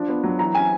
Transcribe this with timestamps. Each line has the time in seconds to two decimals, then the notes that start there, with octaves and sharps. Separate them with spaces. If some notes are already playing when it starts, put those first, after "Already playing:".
Already playing: F3 D4
0.08 B3
0.24 F#3
0.39 E3 A#5
0.55 C#4 G#5